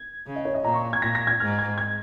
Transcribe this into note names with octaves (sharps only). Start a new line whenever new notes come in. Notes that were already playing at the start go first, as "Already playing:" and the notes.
Already playing: G#6
C#3
D#5
C#5
D#5
A#2 A#5
C#6
G#6
A#2 A#6
A#6
G#6
G#2 F6
G#6
G#6